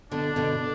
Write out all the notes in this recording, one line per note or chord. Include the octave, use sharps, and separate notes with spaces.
B2 D3 D4
B2 D3